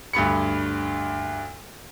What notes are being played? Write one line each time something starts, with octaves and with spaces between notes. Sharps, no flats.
D2 G2 B5 C#7